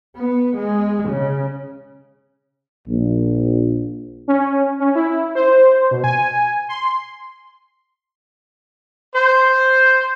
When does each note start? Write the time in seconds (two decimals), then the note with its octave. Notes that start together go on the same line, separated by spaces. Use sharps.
0.17 B3
0.57 G#3
1.08 C#3
2.87 A#1
4.28 C#4
4.80 C#4
4.95 E4
5.35 C5
5.91 B2
6.04 G#5
6.69 C6
9.15 C5